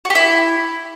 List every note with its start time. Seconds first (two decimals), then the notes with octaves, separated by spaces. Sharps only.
0.05 F#4
0.10 G4
0.15 E4